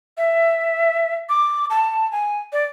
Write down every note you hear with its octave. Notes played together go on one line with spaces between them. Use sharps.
E5
D6
A5
G#5
D5